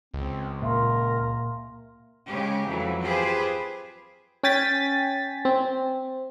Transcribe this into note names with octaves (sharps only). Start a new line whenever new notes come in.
C#2 C4
A#2 A#4 E5 F5 C6
C#3 G#3 C#4 G4
F2 E3 F#3
F4 G4 G#4 B4 C5
C#4 G5 G#5 A6 B6
C4